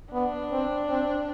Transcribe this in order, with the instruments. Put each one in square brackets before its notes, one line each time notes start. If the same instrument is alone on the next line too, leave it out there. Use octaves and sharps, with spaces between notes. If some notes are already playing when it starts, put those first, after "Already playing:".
[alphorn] B3 [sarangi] D4
[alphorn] C4
C4